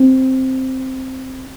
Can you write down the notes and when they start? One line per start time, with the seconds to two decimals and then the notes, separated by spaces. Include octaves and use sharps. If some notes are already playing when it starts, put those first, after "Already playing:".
Already playing: C4